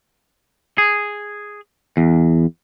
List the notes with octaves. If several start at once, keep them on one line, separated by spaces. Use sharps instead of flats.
G#4
E2